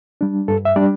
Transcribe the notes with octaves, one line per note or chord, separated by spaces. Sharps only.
G3 D4
G2 A4
E5
G3 D4 D5